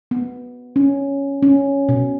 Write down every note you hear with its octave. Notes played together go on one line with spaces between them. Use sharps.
B3
C#4
C#4
B2